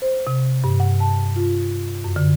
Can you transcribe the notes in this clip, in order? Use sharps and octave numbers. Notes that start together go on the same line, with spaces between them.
C5
C3
G2
F#5
A5
F4
F#2
D3